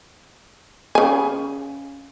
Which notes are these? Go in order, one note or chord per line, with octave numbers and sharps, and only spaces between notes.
C#3 G#5